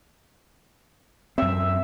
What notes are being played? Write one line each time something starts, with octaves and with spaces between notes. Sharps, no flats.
F#2 C4 E5